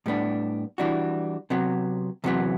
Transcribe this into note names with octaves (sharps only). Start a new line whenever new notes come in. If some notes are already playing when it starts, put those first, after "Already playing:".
A2 G3 B3 D4
E3 G3 D4 F#4
C3 F#3 B3
E2 C3 F#3 B3